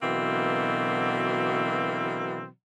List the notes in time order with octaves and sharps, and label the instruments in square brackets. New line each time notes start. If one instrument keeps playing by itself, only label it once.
[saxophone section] B2 D3 E3 F#3 A#3 C4